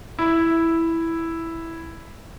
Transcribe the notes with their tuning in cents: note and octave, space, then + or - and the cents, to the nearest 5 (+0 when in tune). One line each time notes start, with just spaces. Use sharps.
E4 +0